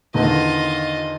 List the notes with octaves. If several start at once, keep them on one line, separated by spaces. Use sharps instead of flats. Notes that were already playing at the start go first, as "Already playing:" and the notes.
E2 D3 D#3 F4 D#5